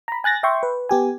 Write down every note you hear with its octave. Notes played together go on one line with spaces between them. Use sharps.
A#5 B5
G#5 F#6 A6 A#6
E5 G5 C6 C#6
B4
B3 G4 G#5